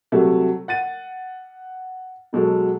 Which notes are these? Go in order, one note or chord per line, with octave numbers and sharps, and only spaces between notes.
C3 F#3 G3 A3 F#4
F#5 A6 D#7
B2 F#3 G#3 A4